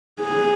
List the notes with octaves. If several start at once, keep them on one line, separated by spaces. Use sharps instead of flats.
G#4